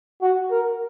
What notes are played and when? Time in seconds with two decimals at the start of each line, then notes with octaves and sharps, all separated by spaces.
0.22 F#4
0.51 A#4